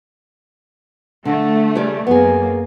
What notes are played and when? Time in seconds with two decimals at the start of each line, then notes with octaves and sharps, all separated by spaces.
1.25 D3 A3
1.75 C#3 G3 D5
2.07 F#2 A#3 B3 G#4